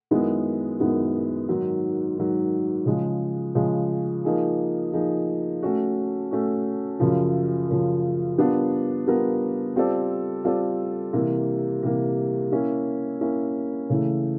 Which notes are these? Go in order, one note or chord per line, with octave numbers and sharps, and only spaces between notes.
F#2 D#3 G#3 B3 E4
F#2 D#3 G#3 B3 E4
G#2 D#3 F#3
G#2 D#3 F#3
C#3 F3 G#3
C#3 F3 G#3
F3 A#3 D#4 G#4
F3 A#3 D#4 G#4
A3 C#4 F#4
A3 C#4 F#4
F#2 C#3 F3
F#2 C#3 F3
G3 B3 D4 F4 A#4
G3 B3 D4 F4 A#4
G3 C4 F4 A4 D5
G3 C4 F4 A4 D5
C3 E3 G3 A#3
C3 E3 G3 A#3
A#3 C#4 E4
A#3 C#4 E4
C#3 E3 A3